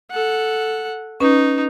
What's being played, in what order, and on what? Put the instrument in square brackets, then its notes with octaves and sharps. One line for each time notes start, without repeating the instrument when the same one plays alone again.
[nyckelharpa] A4 F#5
[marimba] C#4 B4 [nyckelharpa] D#4